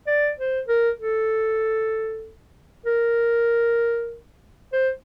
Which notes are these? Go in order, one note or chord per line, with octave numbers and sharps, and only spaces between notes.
D5
C5
A#4
A4
A#4
C5